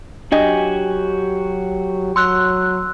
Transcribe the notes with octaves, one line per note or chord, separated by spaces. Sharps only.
F#3 D4 F#4 G4 D#5 G#5
F#3 C6 E6 F#6